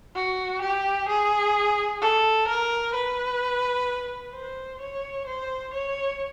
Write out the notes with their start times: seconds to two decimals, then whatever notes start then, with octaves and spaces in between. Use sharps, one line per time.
0.15 F#4
0.62 G4
1.09 G#4
2.01 A4
2.48 A#4
2.94 B4
4.34 C5
4.80 C#5
5.27 C5
5.74 C#5